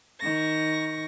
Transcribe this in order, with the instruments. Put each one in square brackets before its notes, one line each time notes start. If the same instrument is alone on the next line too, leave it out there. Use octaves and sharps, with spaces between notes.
[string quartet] D#3 C#6 A#6